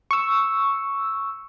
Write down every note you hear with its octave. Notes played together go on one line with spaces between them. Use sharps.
C#6 E6